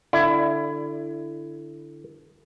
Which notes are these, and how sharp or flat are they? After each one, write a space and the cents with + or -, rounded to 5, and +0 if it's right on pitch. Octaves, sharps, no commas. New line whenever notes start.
D3 +0 E4 +25 D5 +25